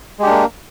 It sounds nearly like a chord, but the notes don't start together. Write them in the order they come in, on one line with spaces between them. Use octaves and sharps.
G#3 G4 D4 A#3